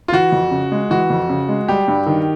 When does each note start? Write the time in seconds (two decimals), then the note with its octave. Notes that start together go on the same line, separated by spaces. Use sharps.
0.08 F4
0.12 E3 F#4
0.32 F2
0.51 C#3
0.72 G#3
0.91 E3 F#4
1.10 F2
1.29 C#3
1.49 G#3
1.68 G3 G4
1.88 G2
2.07 D#3